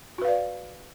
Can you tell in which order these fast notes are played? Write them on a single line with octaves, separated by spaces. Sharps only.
F#4 B4 F5 D5